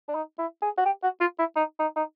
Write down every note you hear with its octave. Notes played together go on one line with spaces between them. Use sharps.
D4
D#4
E4
G#4
F#4
G4
F#4
F4
E4
D#4
D#4
D#4